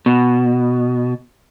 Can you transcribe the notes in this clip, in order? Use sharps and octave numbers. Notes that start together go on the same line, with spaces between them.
B2